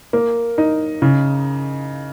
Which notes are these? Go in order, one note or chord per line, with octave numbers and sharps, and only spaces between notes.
A#3
D#4
C#3